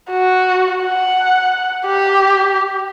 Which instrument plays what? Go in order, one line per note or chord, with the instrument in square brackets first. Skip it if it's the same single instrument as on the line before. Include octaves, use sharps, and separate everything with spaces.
[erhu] F#4
F#5
G4